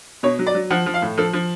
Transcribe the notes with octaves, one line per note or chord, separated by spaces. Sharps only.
B2 C#5
F#3
D5
F#3
F3 F#5
F3
F5
A2
F3 A4
F3